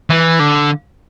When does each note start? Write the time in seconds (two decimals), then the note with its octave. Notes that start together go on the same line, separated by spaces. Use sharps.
0.10 E3
0.40 D3